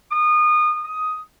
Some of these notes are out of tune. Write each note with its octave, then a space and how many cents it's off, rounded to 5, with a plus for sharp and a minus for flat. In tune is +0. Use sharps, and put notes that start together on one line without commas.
D#6 -30
D#6 +10